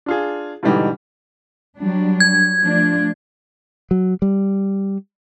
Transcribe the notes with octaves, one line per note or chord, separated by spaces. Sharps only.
D4 F4 G#4
G#2 B2 D3 E3 G3 D#4
F#3 G3 D4
G#6
F3 A3 D4
F#3
G3